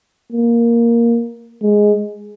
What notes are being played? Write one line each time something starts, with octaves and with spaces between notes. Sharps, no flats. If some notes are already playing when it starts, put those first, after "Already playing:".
A#3
G#3